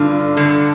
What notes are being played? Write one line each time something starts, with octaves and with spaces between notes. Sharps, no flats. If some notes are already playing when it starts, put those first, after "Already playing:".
Already playing: G2 D3 F4
G2 D3